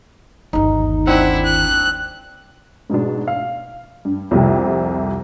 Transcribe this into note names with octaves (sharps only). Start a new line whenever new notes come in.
G1 D#2 D#4
C4 D4 E4 F#5
F#6
G#2 B2 G#3 D4
F5
G2
C2 F2 C3 G3